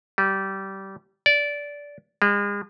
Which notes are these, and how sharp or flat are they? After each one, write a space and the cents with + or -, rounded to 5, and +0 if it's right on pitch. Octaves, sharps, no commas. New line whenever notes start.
G3 -20
D5 -15
G#3 -40